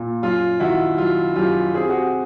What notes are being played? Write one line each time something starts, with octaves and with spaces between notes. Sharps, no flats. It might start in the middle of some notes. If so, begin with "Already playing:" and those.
Already playing: A#2
F#2 F4
D#3 E4 F#4
F#3 F4
F#2 F4 G4
C4 G#4
G4
F#4 G#4